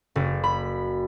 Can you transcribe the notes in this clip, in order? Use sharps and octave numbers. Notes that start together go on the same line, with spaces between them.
F#1
B5